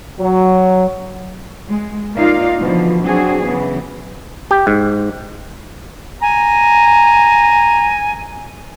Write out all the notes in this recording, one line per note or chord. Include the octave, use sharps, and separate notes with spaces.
F#3
G#3
A#3 D#4 F4 D5 F5
B2 D3 E3 F3
F#3 C4 D4 F#4 G#4
C#3 E3 F#3 B3
G4
G#2
G#5 A#5